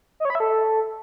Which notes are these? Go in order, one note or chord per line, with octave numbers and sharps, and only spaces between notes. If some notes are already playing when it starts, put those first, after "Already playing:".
D#5
C#5
B5
E5
A4